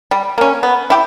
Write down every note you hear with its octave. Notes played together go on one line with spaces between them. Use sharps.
G3
A#3 C#4
B3
E4 G4